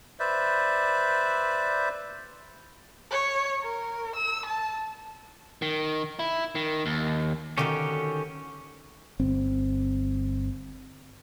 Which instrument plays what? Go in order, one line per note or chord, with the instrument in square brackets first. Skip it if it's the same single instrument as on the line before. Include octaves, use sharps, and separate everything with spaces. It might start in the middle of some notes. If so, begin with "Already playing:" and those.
[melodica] B4 C5 D5 E5
[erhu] C#5
A#4
E6
A5
[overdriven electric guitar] D#3
E4
D#3
D#2
[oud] D3 D#3 F#4 [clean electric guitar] C#4 G4
[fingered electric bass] G1 C4